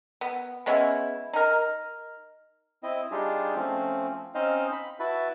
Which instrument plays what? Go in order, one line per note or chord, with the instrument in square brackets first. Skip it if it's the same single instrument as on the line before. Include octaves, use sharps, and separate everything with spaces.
[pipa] B3
G#3 B3 C#4 E4
D#4 A#4
[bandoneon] C4 E4 D#5
G3 D4 D#4 F4 G4 G#4
F3 A3 C4 C#4
C4 C#4 D#4 C5 D#5 F5
B5
E4 F#4 B4 E5 A5